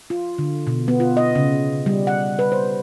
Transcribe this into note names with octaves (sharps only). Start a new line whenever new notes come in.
F4
D3
B2
B3
F4
D#5
C#3
G3
F#5
B4
C5